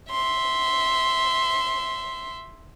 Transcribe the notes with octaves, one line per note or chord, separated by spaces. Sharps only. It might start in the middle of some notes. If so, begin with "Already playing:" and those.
E5 C6